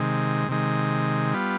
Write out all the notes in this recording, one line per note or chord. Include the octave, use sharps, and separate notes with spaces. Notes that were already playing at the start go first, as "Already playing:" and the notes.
Already playing: C3 D#3 G#3
C3 D#3 G#3
G3 B3 F4